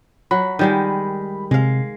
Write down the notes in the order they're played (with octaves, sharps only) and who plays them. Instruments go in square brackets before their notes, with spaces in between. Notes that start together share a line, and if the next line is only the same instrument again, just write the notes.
[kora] F#3 [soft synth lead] B5
[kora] D#3 G3 G#3
[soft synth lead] C3 [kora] G#3 F5